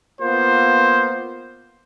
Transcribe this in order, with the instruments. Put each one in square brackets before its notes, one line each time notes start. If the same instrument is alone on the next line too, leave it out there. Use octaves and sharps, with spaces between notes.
[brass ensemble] A#3 B3 F4 C5